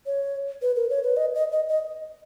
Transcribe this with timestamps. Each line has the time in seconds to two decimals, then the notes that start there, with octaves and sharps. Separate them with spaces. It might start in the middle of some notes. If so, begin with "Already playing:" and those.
0.06 C#5
0.62 B4
0.76 A#4
0.90 C#5
1.03 B4
1.17 D#5
1.35 D#5
1.52 D#5
1.69 D#5